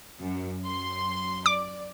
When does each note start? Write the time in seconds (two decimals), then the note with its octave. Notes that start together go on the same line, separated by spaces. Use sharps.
0.21 F#2
0.65 F#2 C6
1.46 D5 D6